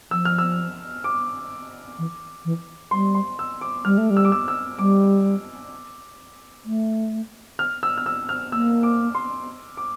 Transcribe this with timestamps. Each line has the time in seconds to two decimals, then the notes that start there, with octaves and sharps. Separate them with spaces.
0.11 F3 E6
0.25 F6
0.38 E6
1.04 D6
1.98 E3
2.45 E3
2.91 G3 C6
3.15 C6
3.39 E6
3.61 D6
3.85 G3 F6
3.98 A3
4.10 G3
4.17 E6
4.25 D6
4.32 E6
4.48 E6
4.79 G3 D6
6.65 A3
7.59 F6
7.83 E6
7.98 F6
8.06 E6
8.29 F6
8.52 A#3 E6
8.83 D6
9.15 C6
9.77 D6